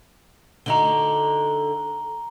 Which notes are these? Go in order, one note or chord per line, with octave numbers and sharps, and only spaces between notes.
D3 D#4 F#4 A#5 F#7 G7